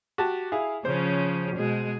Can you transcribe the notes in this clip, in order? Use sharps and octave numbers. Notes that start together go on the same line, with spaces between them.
F#4 G4 A5
E4 G#4 F5
C#3 F3 C#4 C5
B2 G#3 G#4